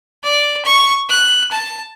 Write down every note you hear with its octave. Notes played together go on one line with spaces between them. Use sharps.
D5
C#6
F#6
A5